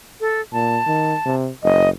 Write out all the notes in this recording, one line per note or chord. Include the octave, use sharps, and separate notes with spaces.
A4
A#2 A5
D#3
C3
F#1 D#5